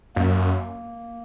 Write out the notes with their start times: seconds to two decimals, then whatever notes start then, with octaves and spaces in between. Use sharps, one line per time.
0.16 F#2 A#3